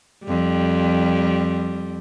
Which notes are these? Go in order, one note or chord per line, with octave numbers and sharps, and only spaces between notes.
F2 G3